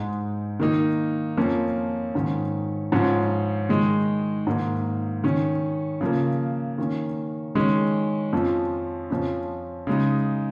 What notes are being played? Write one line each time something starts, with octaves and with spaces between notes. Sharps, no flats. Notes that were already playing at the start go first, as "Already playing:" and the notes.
Already playing: G#2 G#3 D#4
D#3 A#3 D#4
F2 F3 A#3 C#4
G#2 D#3 C#4
G#2 F3 C#4
D#3 G#3 D#4
G#2 D#3 A#3
D#3 C#4
C#3 F3 A#3
D#3 A#3 C#4
D#3 G#3 C#4
F2 F3 C#4
F2 F3 C#4
C#3 G#3 D#4